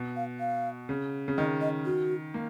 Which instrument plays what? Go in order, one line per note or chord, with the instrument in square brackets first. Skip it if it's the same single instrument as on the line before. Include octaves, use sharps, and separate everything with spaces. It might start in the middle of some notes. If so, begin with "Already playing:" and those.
Already playing: [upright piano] B2
[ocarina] F5
F5
[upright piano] C#3
C#3
[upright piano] D#3 [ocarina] D#5
[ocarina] D#5
F#4
[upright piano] A#3